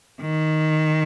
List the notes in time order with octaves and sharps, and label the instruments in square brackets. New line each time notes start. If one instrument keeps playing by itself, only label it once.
[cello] D#3